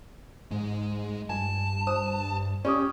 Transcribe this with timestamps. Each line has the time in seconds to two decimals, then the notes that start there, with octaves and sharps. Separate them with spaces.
0.51 G#2 G#3
1.30 G2 G#5 A5
1.87 C5 D#6
2.65 C#4 G4 D5 C#6 D#6